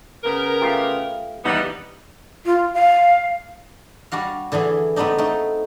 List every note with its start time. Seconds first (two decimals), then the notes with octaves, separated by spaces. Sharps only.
0.24 C#3 B3 A#4
0.61 A3 F4 G4
1.45 D#2 E3 G3 B3 D#4
2.46 F4
2.74 F5
4.12 G3 D4 F#4 F5
4.52 D3 E3 D4 G#4
4.96 A3 B3 C4 D4 D#4
5.18 A3 D#4